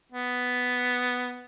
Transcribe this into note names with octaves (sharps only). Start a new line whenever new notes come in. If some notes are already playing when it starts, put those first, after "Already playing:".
B3